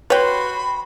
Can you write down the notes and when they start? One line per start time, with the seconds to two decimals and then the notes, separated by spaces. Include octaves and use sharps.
0.10 F#4 B4 C#5 G5 B5 C6